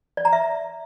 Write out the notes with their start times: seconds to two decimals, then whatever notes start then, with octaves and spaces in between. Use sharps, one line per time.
0.17 D5
0.25 A#5
0.33 E5